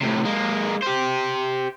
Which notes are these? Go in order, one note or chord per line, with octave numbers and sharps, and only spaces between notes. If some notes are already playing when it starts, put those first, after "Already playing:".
A2 C3
G#3 A#3
G4 C5